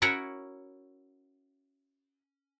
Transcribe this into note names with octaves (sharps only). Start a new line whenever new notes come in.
C#4 E4 F#4 A#4 C#5 A#5